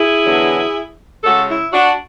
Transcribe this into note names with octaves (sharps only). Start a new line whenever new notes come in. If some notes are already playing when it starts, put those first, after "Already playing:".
Already playing: E4 G#4
E2 D3 F#3 B3 D4
C#3 G#3 C#4 F#4 A4
E4
D4 F#4